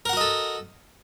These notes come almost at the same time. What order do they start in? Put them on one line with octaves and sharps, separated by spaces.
A#4 F#5 F#4 D#5 A4